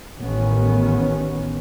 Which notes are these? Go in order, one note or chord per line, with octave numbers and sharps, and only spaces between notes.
A1 D#3 B3 C#4